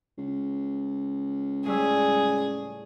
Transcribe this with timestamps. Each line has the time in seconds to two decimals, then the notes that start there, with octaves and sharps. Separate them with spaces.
0.18 C#2
1.66 A2 G3 G#4 E6